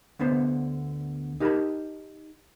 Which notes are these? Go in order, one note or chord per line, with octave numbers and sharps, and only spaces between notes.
D2 D3 B3 C5
D#4 G4 A#4 D#5 A5 B5